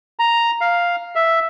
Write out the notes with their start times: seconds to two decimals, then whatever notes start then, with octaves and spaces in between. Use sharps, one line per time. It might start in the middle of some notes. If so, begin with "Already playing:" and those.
0.19 A#5
0.61 F5
1.16 E5